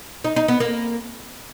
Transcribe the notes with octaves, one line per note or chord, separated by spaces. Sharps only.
D#4
D#4
B3
A#3